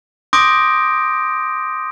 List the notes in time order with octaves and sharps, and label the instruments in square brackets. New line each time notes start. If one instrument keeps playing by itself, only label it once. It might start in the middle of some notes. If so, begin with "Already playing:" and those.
[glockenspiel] C6 D6 D#6 G6 A#6 D7